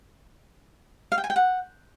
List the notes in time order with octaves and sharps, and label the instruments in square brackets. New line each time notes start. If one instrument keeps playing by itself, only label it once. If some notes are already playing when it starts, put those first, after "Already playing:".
[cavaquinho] F5
G5
G#5
G5
F#5